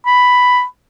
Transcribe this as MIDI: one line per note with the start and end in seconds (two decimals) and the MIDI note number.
0.06 0.64 83